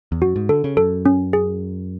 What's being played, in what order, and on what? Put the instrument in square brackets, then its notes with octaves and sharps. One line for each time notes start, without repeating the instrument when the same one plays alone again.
[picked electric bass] E2
[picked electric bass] F#2 [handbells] F#4
[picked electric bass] G#2
[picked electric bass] D3 [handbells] A4
[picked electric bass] C#3
[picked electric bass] F#2 [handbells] A4
[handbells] C#4
G#4